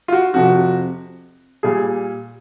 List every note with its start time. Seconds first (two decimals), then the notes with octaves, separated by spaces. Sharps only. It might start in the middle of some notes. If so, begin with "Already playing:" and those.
0.08 F4
0.12 F#4
0.34 F2 C3 F3 F#4
1.63 A#2 G3 G#4